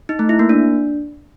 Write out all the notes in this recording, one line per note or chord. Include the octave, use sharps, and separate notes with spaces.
D#4
A3
E4
A#3
D4